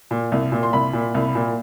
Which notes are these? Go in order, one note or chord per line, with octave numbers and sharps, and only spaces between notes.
A#2
C2
A#2
C6
C2 B5
A#2
C2
A#2